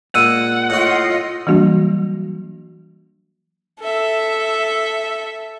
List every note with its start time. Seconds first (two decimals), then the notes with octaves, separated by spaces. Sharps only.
0.15 A#2 G#3 F#5 E6 D#7
0.70 A2 F4 F#4 D#5
1.47 E3 F#3 G3 A#3 D4 F#4
3.81 A4 E5